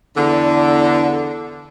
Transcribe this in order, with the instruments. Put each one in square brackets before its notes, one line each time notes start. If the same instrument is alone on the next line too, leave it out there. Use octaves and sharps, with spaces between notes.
[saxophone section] E2 D3